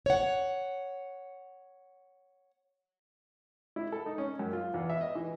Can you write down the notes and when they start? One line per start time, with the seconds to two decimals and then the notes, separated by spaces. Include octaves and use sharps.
0.06 C#5 F#5
3.76 E4
3.92 A4
4.06 D#4
4.18 C#4
4.39 F#2
4.53 F4
4.74 E2
4.90 E5
5.01 D#5
5.15 E3